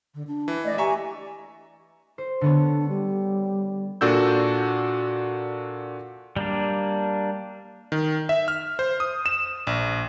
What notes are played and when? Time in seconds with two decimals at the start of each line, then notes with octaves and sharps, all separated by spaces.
0.14 D3
0.27 D4
0.48 E3
0.64 A3 D5 D#5
0.78 G4 E5 G#5 A#5 C#6
2.18 C5
2.41 D3 B3 D4 C#5
2.89 G3
4.01 A#2 D4 F#4 A4 E6 G6
6.36 G3 A#3 D4
7.92 D#3
8.29 E5
8.48 F6
8.79 C5
9.00 D#6
9.26 E7
9.67 A#1